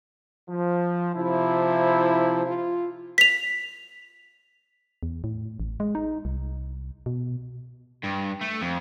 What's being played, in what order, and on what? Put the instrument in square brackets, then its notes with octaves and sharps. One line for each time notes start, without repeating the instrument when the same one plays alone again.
[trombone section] F3
[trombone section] C3 E4 [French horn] F3
[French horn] F4
[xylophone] B6 F7
[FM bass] E2
A2
A1
G#3
D#4
C2
B2
[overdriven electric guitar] G2
A3
F2